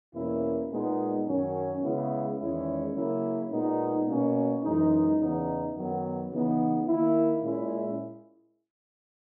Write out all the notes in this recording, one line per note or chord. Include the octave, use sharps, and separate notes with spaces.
E2 B2 A#3 C#4 E4
A#2 G#3 B3 D#4
F#2 D#3 F#3 C#4
C#3 G#3 B3 E4
E2 D#3 G#3 C#4 E4
C#3 F#3 A#3 C#4 E4
A#2 G#3 B3 D#4
B2 A#3 C#4
F#2 E3 G#3 D#4
E2 C#3 E3 B3 D#4
F#2 D#3 F#3 B3
C#3 E3 B3 D#4
D#3 A#3 E4
A#2 G#3 C#4 E4